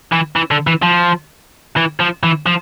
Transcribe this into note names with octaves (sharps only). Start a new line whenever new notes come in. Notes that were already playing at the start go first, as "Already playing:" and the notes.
E3
E3
D3
E3
F3
E3
F3
E3
F3